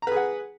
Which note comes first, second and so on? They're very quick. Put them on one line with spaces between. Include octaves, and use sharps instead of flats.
A#5 B4 G#4 F#5